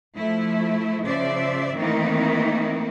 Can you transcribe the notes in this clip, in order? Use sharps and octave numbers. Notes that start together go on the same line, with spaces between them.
F3 A3 E4
C#3 F3 C5 D5 E5
D#3 E3 A3 A#3 C4 D#4